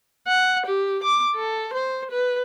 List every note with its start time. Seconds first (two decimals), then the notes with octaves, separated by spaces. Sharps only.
0.27 F#5
0.66 G4
1.03 D6
1.35 A4
1.74 C5
2.11 B4